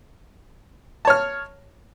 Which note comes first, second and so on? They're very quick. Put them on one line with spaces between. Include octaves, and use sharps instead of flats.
A5 C#5 F6